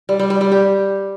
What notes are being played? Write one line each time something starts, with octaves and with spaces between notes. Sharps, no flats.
G3
G3
G3
G3
G4